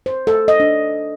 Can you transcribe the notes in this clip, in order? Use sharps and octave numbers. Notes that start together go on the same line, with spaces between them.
C5
A4
D#5
D4